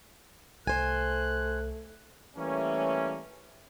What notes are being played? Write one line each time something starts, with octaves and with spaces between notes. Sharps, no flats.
C2 A3 C5 G#5 F#6
E3 G3 A3 A#3 C#4